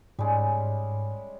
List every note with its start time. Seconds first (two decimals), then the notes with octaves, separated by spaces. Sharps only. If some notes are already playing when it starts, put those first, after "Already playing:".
0.19 G#2 G3 G#3 C#4